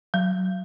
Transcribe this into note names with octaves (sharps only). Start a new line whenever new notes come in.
F#3